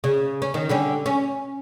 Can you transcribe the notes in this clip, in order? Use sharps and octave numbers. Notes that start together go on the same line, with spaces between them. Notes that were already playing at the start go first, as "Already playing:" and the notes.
C#3
C#4
D#3
D3 G3 C#4
C#4